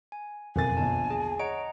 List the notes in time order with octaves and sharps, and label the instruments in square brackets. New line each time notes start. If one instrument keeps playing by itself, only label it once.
[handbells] G#5
[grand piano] F#1 A#4 A6 [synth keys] F2 B2 [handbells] C4 [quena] G#5
[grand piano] A#1 E2 D3 [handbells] A5
[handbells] G#4 [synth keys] A5
[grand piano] C#5 [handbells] D#5 F#5 A#5 [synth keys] D7